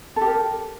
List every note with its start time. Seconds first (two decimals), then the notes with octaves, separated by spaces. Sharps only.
0.16 A4
0.21 G4
0.26 A#4